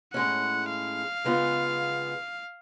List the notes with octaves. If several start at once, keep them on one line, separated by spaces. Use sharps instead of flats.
A2 G#3 C#4 F#5
F5
C#3 G#3 B3 F4